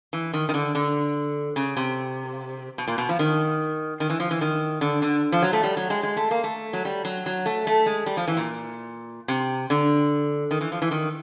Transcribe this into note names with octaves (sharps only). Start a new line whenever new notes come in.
E3
D#3
D#3
D3
D3
C#3
C3
B2
A#2
B2
F3
D#3
D#3
E3
F3
E3
D#3
D3
D3
F3
F#3
A3
G3
F#3
G#3
G#3
A3
A#3
A3
F#3
G3
F#3
F#3
A3
A3
G#3
G3
F3
E3
A#2
C3
D3
D#3
E3
F3
E3
D#3